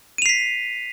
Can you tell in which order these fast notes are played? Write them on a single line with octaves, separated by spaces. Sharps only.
D#7 F7 C7 B6